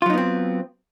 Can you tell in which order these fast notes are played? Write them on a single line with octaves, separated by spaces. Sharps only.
F4 F#3 D#4 B3 C4